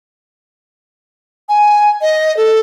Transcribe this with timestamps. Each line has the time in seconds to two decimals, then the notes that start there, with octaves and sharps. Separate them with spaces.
1.49 G#5
2.01 D#5
2.37 A4